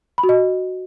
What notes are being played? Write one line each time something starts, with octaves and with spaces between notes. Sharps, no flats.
B5
F#4
D#5